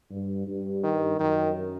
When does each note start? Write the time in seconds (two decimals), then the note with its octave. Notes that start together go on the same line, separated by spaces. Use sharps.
0.11 G2
0.47 G2
0.83 D#3
1.19 F#2 D#3